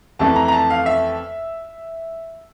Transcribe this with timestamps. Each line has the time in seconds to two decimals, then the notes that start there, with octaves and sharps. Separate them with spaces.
0.19 F2 E3 A3 A5
0.36 A#5
0.48 A#5
0.53 A5
0.70 F5
0.86 E5